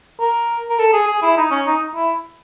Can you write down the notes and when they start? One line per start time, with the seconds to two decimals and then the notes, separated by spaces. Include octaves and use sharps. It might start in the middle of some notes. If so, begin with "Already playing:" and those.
0.20 A#4
0.70 A#4
0.79 A4
0.93 G#4
1.08 G#4
1.22 E4
1.37 D#4
1.51 C#4
1.66 D#4
1.95 E4